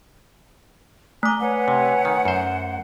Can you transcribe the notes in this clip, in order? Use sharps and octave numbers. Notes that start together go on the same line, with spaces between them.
A3 G#5 A#5 D6 F#6
B4 C#5 F#5 G#5
C3
D#3
F#2 C5